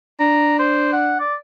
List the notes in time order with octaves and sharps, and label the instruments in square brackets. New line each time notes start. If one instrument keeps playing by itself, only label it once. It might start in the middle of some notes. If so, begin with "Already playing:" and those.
[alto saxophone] D4 [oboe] A#5
[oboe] C5
F#5
D5